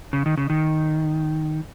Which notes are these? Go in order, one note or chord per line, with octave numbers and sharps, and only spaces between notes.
C#3
D#3
C#3
D#3